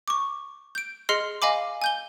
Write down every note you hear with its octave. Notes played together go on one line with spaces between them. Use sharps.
C#6 D6
G6 D7
G#4 D#5 C6 F6 C7 C#7
D#5 F5 G#5 B5 D6
G#5 G6 G7